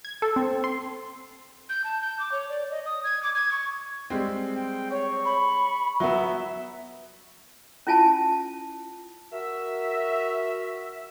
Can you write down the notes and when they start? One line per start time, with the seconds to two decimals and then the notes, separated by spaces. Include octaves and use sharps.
0.05 G#6
0.22 A4
0.36 C4
0.64 C6
1.69 G6
1.84 A5
2.01 G6
2.19 D6
2.32 C#5
2.49 D5
2.71 D#5
2.86 D#6
3.04 G#6
3.23 D6
3.35 G#6
3.52 C#6
4.10 G3 G#3 C4
4.55 G5
4.91 C#5 C#6
5.25 B5
6.00 F#3 B3 E5
7.87 C#4 E4 F4 G#5 A5
9.32 F#4 A#4 E5